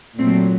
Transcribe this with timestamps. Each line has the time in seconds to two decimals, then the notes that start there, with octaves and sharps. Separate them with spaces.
0.18 A#2 F#3 A3 C4